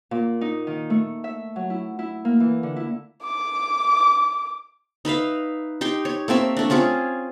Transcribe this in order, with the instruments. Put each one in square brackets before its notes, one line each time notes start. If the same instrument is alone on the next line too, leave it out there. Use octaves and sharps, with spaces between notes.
[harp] A#2
D#4
D#3
A3
E5
F#3
E4
E4
A#3
E3
D3
E4
[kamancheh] D6
[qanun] D#4 B4 E5 F5
D#4 G4 G5 C6
C#5
A3 A#3 C4 E5
A3 D4
C4 C#4 F4 G#4